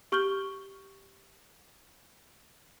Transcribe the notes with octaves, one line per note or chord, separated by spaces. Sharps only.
G4 C#6 F6 G6 F#7 G7